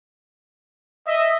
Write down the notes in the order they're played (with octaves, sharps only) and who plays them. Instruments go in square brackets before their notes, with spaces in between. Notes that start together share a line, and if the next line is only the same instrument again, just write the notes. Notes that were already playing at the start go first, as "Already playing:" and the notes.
[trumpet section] D#5 [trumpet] E5